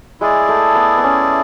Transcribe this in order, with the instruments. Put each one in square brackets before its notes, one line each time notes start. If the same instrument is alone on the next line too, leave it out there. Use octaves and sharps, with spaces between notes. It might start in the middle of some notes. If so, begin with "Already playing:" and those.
[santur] G#3 [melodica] E4 G#4 D5
[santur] A3
B3
B3
C#4